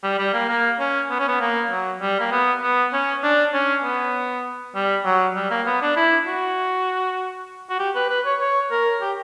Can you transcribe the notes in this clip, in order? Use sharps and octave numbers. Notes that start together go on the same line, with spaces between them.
G3
G3
A#3
A#3
C#4
B3
C#4
B3
A#3
F#3
G3
A#3
B3
B3
C#4
D4
C#4
B3
G3
F#3
G3
A#3
B3
D4
E4
F#4
F#4
G4
B4
B4
C#5
C#5
A#4
G4